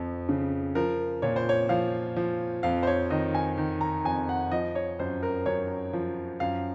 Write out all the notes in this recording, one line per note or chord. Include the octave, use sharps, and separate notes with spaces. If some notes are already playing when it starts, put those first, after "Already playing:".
Already playing: F2 F3
C#3
F3 A#4
A#2 C#5
C5
C#5
F3 F5
F3
F2 F5
C5
C#5
D#3 D#5
G#5
D#3
A#5
F2 G#5
F#5
F3 D#5
C#5
F#2 C5
A#4
F#2 C#5
F3
F#2 F5